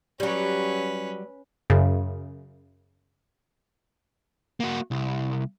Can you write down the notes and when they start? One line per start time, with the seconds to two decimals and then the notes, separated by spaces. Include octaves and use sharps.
0.20 F#3 G3 C#4 B4
1.70 F#2 C#3
4.60 A#3 F#4
4.91 C2